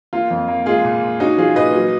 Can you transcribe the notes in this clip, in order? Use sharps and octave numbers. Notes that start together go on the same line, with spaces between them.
A#3 F4
F2
A#3
G#3 F4 G#4
A#2
A#2
C#4 D#4 F#4
F3 F4 G#4
A#2 B4 D#5
F#3